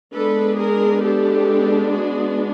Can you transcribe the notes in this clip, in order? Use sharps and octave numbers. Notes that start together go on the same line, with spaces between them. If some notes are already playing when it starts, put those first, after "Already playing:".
G#3 B3 D4 A4 B4
G#4 A#4
G4 A4
F#4 G#4